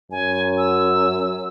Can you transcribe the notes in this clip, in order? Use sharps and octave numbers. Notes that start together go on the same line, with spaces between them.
F#2 G#5
E6